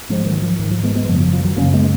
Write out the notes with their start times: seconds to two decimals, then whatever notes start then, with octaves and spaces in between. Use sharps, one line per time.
0.09 G#2 F3 G#3
0.26 D#3 F#3
0.42 F3
0.59 G#2 D#3
0.71 F3
0.83 G#3 B3
0.95 G#3 B3
1.08 F#2 C#3 F3
1.20 F3
1.33 F3
1.44 D#3 F#3
1.56 F#2 C#3 A#3 C#4
1.74 G#3 B3